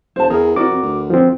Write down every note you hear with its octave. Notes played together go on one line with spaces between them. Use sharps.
E1 C5 A5
E2 G#4 A#4
C3 F#4 A#4 D5 D6
F2
D2
F3 C4